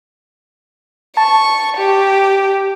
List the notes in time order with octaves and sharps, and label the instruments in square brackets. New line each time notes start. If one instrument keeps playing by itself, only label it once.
[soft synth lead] A5 [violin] C#6
[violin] G4